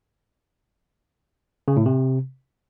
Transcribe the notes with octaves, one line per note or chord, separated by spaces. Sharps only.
C#3
A2
C3